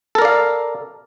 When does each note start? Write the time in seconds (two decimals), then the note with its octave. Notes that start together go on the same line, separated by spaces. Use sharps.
0.15 A4
0.18 A#4
0.22 D5
0.25 F5